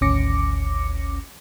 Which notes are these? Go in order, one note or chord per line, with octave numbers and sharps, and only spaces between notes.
G#1 D2 C#4 D6 A#6 C#7